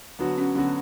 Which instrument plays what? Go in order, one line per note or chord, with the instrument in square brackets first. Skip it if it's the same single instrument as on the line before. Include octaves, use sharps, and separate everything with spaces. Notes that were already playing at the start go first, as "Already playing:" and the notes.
[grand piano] D3 F#3 B3 F#4 [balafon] D4
[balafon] C#4
[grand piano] D3 F#3 B3 F#4 [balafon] C#4